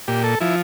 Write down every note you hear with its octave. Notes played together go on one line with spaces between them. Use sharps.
A#2 G4
A4
F3 E4